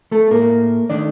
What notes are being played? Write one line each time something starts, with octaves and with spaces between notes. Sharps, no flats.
A3 A4
A2 F#3 A3 A#3 A#4
D#3 A3 D4 D5